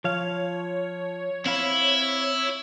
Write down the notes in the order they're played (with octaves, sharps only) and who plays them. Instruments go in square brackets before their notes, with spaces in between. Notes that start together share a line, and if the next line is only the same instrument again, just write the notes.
[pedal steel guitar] F3 F5 [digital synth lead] C#5
[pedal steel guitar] C4 F5 B5 [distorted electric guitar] E4